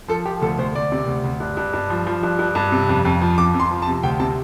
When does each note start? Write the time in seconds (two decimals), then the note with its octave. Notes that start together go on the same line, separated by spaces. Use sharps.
0.08 F3 A4
0.26 F3 G4
0.41 D2 A4
0.58 D2 C5
0.75 D2 D5
0.92 C3
1.07 D2
1.24 D2
1.40 G2
1.57 G2
1.74 G2
1.90 F3
2.07 F3
2.23 G2
2.39 G2
2.55 G2
2.72 C3
2.89 F2
3.05 F2
3.21 F3
3.38 F2 D6
3.54 F2
3.60 C6
3.71 F3
3.82 A5
3.87 C3
4.03 D2 G5
4.20 C3 A5